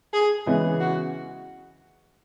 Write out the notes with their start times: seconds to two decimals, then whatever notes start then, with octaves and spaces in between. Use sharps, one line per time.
0.13 G#4
0.46 C#3 E3 G#3 B3
0.80 F#4